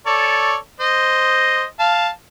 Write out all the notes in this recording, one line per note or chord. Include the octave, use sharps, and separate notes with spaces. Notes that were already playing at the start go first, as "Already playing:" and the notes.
A4 C#5 D5
C5 D#5
F5 A5